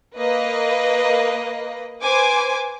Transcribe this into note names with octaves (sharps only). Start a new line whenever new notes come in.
A#3 B4 D#5
B4 C5 G#5 D6